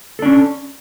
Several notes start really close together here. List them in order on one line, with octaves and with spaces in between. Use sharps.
A4 D4 C#4